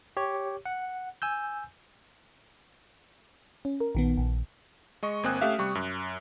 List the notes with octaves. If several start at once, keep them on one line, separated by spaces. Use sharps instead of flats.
G4 C#5
F#5
G#5 E6 G6
C#4
A#4
A#1 D#3 B3
A#1
G#3 D#5 C#6
G1 A#3 C4 G#5 D#6 F#6
A3 C#4 G4 E5 F5
C3 G3 C#6
F#2